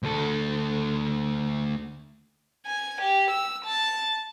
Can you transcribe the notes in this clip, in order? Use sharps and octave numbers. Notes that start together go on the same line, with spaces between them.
D2 A4
G#5
G4
E6
A5